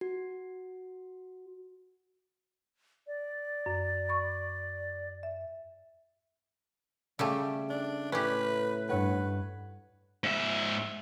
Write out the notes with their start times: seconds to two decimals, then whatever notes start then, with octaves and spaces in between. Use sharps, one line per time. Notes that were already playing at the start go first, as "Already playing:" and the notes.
0.01 F#4
3.07 D5
3.66 F#2
4.09 B5 C#6
5.23 E5
7.19 C#3 G3 A3 D5 E5 G5
7.70 D4
8.12 A2 C#4 G4 B4
8.89 G2 B4 C#5 F#5
10.24 G#2 E5